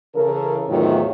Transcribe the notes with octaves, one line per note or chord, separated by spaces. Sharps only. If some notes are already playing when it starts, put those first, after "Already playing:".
C#3 E3 A4 A#4
E2 A2 C3 D#3 F#3 F4